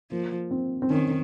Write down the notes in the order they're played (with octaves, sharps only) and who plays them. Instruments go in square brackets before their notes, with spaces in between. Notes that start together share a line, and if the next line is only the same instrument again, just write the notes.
[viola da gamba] F3 [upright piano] A#3
[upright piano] C4
C4
[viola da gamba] D#3 [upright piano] C#4